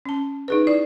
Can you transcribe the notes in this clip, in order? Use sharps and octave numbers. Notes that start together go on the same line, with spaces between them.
C#4 A5
D#4 G#4 B4
E4 D5